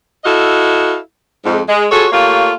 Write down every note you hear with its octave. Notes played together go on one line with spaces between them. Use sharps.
E4 F#4 A4 D#5 F5
F2 G#2
G#3
F4 F#4 G#4 A4 C#5
A3 A#3 F4 G4 C#5